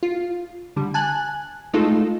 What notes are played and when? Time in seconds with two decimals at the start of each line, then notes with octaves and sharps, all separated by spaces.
0.03 F4
0.76 D3 G3
0.94 G#5 A5 F#6
1.73 G#3 A3 D#4 F4 A4